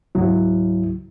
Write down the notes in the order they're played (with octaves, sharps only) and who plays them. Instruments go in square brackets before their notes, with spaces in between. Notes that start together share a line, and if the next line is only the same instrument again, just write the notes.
[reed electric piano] C#2 G#2 F#3 E4